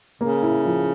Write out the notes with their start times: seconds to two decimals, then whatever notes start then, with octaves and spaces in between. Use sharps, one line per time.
0.21 C#3 A#3
0.43 E4
0.65 F3